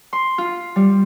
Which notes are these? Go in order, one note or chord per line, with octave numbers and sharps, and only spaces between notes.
C6
F4
G3